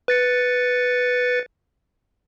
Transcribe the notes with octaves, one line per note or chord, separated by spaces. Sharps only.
B4 A6 C#7